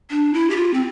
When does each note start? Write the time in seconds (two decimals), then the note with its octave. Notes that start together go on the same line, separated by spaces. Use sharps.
0.10 D4
0.34 E4
0.50 G4
0.56 F4
0.74 C4